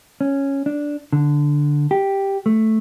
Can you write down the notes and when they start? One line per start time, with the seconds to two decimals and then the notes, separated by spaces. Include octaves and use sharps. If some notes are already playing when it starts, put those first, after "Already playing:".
0.21 C#4
0.66 D4
1.13 D3
1.91 G4
2.46 A3